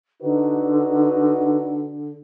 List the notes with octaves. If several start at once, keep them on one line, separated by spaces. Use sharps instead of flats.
D3 D#4 F#4 B4